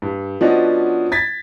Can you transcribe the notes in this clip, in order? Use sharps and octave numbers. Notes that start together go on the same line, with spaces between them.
G2
F3 B3 C#4 D4 F#4 D#5
G#6 A6 B6